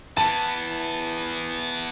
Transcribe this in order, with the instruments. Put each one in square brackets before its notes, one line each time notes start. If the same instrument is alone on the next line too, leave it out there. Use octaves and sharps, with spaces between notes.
[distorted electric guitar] E3 B3 [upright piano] A5